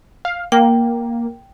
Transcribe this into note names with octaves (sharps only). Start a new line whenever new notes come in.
F5
A#3 G5